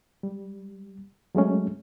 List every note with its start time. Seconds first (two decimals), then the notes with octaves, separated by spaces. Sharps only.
0.23 G3
1.35 F#3 G#3 A3 C#4